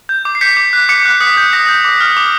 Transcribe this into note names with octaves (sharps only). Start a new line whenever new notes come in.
G6
D6
C7
G6 B6 C#7
D6
F#6
D6 B6 C#7
F#6
D#6 B6
G6
D#6 A#6
G6
D6
F6
D6